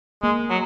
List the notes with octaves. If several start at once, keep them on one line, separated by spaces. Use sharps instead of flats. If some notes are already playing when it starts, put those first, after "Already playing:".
G#3 A#3
F#3